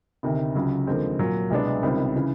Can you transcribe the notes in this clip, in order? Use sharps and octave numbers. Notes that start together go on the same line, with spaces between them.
D2 C3 D#3
C#2 C#3 F#3
D#2 D3 F3 G#3 C4
A#2 F#3 A#3
C2 B2 G#3 B3 D4
C#2 C3 D#3 G3 C4
C#3 E3